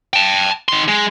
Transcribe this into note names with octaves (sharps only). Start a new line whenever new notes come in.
G5 A5
D#3 C6
G#3